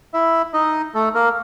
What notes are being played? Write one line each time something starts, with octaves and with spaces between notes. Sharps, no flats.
E4 E5
D#4 D#5
A3 A4
A#3 A#4